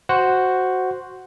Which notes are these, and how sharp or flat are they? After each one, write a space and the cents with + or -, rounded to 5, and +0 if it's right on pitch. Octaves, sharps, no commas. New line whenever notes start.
F#4 +0 C5 +0 F#5 +0